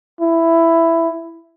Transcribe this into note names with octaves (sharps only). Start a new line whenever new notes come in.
E4